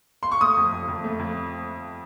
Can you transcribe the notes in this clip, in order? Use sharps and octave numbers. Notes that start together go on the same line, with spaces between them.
C6
C#6
A3 D#6
F2
F2
F2
A3
F2